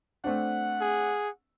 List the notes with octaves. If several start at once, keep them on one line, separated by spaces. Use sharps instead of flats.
A3 C4 D4 F#5
G#4